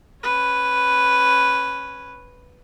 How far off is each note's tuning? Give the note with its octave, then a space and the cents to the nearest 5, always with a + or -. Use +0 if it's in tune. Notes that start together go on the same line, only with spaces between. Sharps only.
C#4 -10 B4 +0